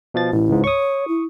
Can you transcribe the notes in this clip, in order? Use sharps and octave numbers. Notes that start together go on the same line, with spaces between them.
B2 F3 A6
A1 E4
C#2 G#2
C#5 C#6 D#6
E4